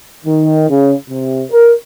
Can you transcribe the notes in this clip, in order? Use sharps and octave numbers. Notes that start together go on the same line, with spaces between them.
D#3
C#3
C3
A#4